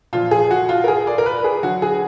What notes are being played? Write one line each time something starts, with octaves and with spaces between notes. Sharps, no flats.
A#2 F3 F4
G#4
F#4
F4
A#4
G#4
D5
A#4
B4
G#4
D3 F#3 F#4
G#4